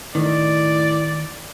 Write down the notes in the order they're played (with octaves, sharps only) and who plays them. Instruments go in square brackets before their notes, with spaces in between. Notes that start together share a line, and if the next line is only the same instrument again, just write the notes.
[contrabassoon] A2 [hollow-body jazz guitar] D#3 [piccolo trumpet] D5